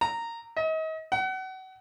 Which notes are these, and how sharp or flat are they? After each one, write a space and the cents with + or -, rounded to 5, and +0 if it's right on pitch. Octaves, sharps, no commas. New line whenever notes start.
A#5 -15
D#5 +35
F#5 +30